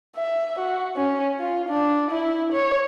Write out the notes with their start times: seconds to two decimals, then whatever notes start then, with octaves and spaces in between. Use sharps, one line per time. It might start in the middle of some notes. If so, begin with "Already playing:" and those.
0.16 E5
0.59 F#4
0.96 C#4
1.40 F4
1.69 D4
2.11 E4
2.52 C#5